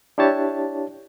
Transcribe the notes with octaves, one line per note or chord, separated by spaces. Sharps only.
D4 E4 G4 C#5 A5